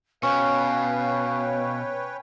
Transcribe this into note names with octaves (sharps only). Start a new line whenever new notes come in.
B2 C#4 B4 C#5 F5 G5